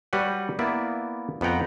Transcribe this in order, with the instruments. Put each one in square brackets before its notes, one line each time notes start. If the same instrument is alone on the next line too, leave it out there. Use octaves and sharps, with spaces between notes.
[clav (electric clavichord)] G3 F#4 B4 C#5 F#5
A#3 B3 E4 D5 E5
F2 B3 F#5 G5 A#5